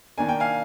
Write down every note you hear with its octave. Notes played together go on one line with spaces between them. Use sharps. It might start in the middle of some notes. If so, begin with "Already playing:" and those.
D#3 A#3 D4 G#5
G5
F5 G#5